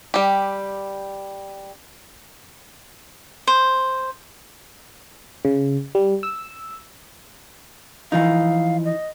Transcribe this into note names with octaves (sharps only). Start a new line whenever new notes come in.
G3 G4
C5
C#3
G3
E6
E3 F3 D#4 F5
D#5